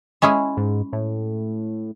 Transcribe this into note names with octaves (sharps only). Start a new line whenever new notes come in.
G#3 C#4 E4 G#4
G#2
A2